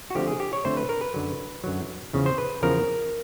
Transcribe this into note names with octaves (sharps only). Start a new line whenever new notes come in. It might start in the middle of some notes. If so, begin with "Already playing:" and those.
F#4
D3 F3 A3 C4 G4
G#4
G4
C#5
D3 F3 A3 C4 C5
B4
A#4
B4
F#2 D3 F#3
F#2 D3 F#3
E2 C#3 F3
C5
B4
E2 C#3 F3 A#4